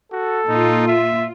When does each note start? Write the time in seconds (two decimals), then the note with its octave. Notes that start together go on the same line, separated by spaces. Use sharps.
0.12 F#4 A4
0.48 A#2 D#4 F4
0.88 E5